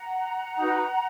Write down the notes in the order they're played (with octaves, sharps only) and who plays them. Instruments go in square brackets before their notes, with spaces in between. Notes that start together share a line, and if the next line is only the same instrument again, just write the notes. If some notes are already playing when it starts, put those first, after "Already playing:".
Already playing: [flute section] F#5 A#5
D#4 F#4 B4